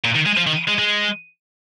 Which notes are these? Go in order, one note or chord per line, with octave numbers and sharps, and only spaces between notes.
A#2
D#3
G#3
F3
D#3
G#3
G#3